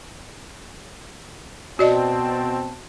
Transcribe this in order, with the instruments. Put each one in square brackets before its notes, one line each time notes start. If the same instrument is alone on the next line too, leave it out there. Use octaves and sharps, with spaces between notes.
[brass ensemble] B2 C4 A5 [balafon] F#4 D5 D#5